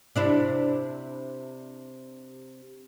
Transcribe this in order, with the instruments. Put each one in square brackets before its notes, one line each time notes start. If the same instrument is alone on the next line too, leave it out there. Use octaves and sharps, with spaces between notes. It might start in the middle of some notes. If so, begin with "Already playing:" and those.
[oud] C3 D4 E4